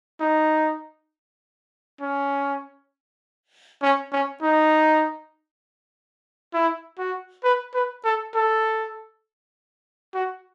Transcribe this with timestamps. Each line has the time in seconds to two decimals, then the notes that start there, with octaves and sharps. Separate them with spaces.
0.20 D#4
2.01 C#4
3.83 C#4
4.12 C#4
4.42 D#4
6.54 E4
6.99 F#4
7.44 B4
7.74 B4
8.04 A4
8.35 A4
10.14 F#4